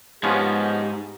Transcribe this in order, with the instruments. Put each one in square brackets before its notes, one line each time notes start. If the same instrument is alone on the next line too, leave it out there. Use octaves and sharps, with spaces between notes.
[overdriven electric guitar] G#2 [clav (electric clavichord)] F3 B3 C#4 [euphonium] G4